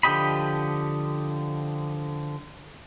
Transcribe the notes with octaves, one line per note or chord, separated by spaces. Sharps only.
D3 F3 G4 D#5 B5